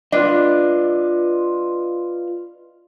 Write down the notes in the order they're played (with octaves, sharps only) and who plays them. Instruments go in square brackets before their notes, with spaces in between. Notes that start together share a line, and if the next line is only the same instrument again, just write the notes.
[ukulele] D4 [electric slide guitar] F4 B4 D#5